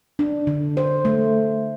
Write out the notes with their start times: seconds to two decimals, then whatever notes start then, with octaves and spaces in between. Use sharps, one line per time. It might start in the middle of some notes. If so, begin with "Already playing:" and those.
0.19 D4
0.47 D3
0.77 C5
1.05 A3